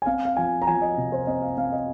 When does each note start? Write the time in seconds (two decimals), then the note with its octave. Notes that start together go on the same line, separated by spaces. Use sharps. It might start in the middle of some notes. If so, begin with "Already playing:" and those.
0.02 G#5
0.06 C4 F5
0.25 F5
0.37 F3 G#5
0.62 A#5
0.67 F3 G#5
0.82 D#5
0.97 C3
1.12 C5
1.27 C4 D#5
1.42 F5
1.57 C4 F5
1.72 D#5